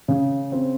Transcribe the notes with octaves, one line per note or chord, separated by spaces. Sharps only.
C#3
C4